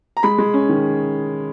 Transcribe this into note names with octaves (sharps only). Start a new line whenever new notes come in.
A#5
G#3 B5
G#3
C#4
D#3